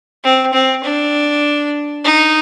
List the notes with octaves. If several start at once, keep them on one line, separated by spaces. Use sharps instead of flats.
C4
C4
D4
D#4